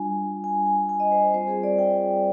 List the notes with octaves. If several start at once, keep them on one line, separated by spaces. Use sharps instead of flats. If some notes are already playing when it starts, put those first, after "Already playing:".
Already playing: G3 D4 F4 G#5
G#5
G#5
G#5
D#5
C5
G3 C4 F4 C5
G#4
D5
G5